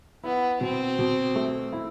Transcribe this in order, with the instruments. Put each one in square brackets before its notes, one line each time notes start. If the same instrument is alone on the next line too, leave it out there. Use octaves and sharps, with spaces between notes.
[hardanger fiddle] B3 [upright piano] E4
[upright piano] B2 [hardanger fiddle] C4
[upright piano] B2
A3
E4